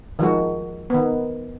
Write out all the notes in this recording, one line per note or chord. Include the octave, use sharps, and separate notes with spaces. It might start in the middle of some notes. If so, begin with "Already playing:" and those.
D#3 F3 G#3 F#4
D#3 B3